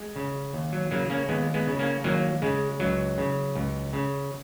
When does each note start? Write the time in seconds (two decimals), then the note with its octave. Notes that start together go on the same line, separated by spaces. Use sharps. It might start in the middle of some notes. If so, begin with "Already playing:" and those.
Already playing: G#3
0.16 C#3
0.53 D#2
0.72 F#3
0.91 C#3 F#3 A#3
1.10 A#3 C#4
1.29 D#2 G#3 B3
1.54 G#3 B3
1.67 C#3
1.79 A#3 C#4
2.04 D#2 F#3 A#3
2.42 C#3 G#3
2.80 C#2 F#3
3.18 C#3
3.55 C#2
3.93 C#3